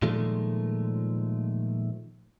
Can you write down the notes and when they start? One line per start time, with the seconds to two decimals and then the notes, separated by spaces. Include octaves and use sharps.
0.02 A#2 D#3 F3 G#3 A3